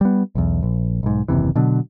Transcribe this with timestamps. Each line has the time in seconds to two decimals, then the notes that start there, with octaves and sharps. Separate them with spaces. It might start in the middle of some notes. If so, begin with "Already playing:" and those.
0.01 G3 B3
0.35 B1 E2
0.63 A#1
1.03 B1 G#2
1.28 F#1 D#2 C3 E3
1.56 B2 D3 F#3